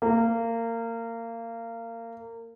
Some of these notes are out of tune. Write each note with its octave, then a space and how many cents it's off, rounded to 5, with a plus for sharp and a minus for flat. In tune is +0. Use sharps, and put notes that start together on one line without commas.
A#3 -25